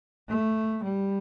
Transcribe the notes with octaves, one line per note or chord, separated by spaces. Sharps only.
A3
G3